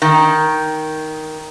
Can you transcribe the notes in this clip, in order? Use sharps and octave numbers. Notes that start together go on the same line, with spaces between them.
D#3